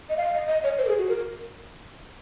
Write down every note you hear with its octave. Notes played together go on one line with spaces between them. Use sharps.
D#5
F5
D#5
D#5
C#5
C5
A#4
G#4
F#4
A#4